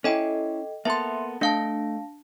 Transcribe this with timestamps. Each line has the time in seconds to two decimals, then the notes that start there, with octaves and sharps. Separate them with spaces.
0.04 C#4 E4 A4 D#5 G5
0.85 A#3 B3 A4 E5 C6
1.41 A3 D4 D#5 F5 A5